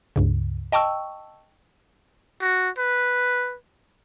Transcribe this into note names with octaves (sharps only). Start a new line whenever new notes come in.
C#2 G2 C#3
D#5 G5 A5 C#6 E6
F#4
B4